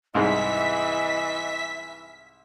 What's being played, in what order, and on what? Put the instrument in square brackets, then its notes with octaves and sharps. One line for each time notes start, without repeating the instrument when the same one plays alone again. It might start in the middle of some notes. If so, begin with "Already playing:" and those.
[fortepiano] C2 G#2 G#4 [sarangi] E3 [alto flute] D#5 [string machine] E5 B6